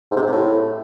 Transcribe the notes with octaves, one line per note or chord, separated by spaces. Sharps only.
G#2
C3
G#2
C3
A2